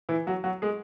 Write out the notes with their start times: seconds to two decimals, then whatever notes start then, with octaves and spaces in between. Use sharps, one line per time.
0.09 E3 E4
0.27 F#3 F#4
0.44 F#3 F#4
0.62 G#3 G#4